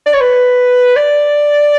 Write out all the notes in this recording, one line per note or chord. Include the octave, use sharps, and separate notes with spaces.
D5
C#5
B4
D5